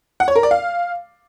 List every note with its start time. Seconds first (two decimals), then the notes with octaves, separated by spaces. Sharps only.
0.20 F#5
0.28 C#5
0.36 A#4
0.43 D5
0.51 F5